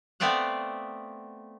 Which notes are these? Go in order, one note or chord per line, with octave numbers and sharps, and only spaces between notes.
A3 B3 C4 D5 F5 F#5